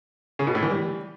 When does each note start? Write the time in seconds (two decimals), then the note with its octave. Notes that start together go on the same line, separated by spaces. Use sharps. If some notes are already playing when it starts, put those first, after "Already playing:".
0.39 C#3
0.47 B2
0.55 A2
0.63 E3
0.70 G3